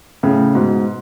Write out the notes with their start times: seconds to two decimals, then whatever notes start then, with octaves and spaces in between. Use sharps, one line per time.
0.23 A2 C#3
0.55 G#2 B2